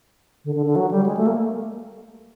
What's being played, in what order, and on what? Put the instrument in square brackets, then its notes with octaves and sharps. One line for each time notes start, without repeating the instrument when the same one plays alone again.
[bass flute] D3
D3
D3
F#3
G3
G#3
A3
A#3